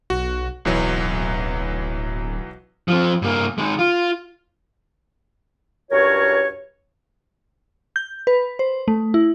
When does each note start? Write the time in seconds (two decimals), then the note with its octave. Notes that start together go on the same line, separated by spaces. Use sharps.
0.10 B1 F#4
0.65 D1 B1 E3 F#3
2.88 F3 C4
3.22 G2 A#3
3.58 D#3 G#3
3.79 F4
5.91 C#2 G2 F#4 A#4 C#5
7.96 G6
8.27 B4
8.59 C5
8.88 A3
9.14 E4